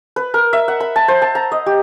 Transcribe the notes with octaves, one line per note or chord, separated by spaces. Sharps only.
B4
A#4
E5
F#5
B5
A5
C5
A5
A#5
D#5
G4